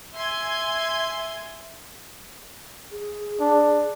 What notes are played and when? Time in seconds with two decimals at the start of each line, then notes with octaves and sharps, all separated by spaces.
0.15 E5 G#5 C6 G#6
2.91 G#4
3.40 D4